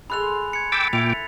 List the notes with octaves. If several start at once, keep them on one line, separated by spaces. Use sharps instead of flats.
G#4 A4 B5 C6 F#6 F7
G#6 C#7
G5 D6 E6 A6 B6
A#2 E4 G5 D6 F7